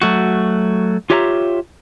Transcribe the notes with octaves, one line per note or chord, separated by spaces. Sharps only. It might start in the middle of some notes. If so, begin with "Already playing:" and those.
F#3 A3 F#4
F4 G4 C#5 E5 F#5 A#5